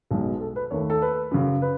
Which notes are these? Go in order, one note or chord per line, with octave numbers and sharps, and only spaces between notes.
B1 B2 G#3
A4
B4
D#2 D#3 A3 C#5
A4
B4
F#2 C#3 F#3
B4